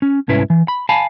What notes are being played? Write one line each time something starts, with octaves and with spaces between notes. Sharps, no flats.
C#4
C2 G#2 C#4 E4 B4
E3
B5
F5 G#5 A5 B5